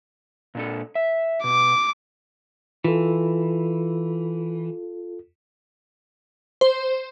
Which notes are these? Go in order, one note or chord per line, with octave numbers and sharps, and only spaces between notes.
A#2 D4 A4
E5
B2 D6
E3 F4 A4
C5